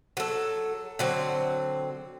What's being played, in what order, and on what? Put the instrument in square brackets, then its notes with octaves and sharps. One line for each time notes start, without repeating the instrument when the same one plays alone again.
[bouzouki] F#3 A4
D3 F#3 C4